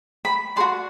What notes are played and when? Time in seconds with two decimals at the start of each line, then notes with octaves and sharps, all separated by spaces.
0.25 B5
0.56 A4 D5 C6
0.60 F#4